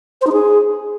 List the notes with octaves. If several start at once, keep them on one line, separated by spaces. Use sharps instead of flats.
C5
D#4
G#4